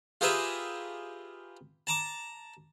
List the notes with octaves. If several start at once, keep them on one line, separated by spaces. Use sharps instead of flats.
F4 G4 G#4 A#4 B4 E5
A5 A#5 D6